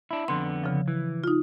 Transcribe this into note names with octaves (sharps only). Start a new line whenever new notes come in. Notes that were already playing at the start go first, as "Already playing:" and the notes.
D4 E4
F2 D3 B3 C6
C#3 F3
E3
D#4 F4